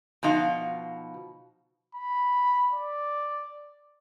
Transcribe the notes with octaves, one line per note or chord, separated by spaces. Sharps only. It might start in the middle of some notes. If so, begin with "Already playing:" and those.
B2 F3 D#4 F5
B5
D5